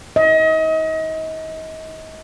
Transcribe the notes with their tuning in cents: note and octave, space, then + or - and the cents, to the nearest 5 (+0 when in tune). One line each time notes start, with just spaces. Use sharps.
D#5 +35